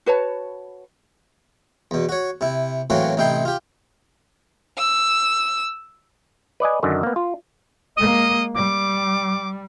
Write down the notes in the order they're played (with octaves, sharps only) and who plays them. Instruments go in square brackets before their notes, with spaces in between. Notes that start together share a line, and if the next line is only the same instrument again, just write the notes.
[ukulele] F#4 B4 C#5 A5
[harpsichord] E2 B2
F#4 C#5
C3 E4
A2 E3 F#3 A#3 C4 F#4
A1 C3 D#4 E4 G5 C6
F4 G4
[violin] E6
[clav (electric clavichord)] B4 D5 D#5 G#5
F#2 D3 D#3
A#3 B3
F4
[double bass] G#3 A#3 [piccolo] D#5
[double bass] G3 [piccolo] D6